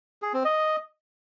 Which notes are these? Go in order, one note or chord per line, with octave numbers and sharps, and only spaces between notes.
G#4
C4
D#5